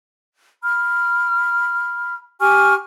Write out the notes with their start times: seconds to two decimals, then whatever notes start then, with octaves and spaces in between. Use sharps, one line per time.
0.62 B5 F6
2.40 G4 G#5 C#6 F6